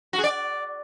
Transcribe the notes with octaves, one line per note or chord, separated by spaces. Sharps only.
F#4
G#4
D5